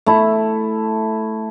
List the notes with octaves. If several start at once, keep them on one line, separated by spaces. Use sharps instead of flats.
A3 E4